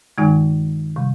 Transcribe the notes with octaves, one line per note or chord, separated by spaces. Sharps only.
G2 D#3 G#3 D#4
C3 G3